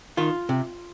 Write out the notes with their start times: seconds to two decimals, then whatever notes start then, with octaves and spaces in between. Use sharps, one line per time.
0.17 D#3 F4
0.49 C3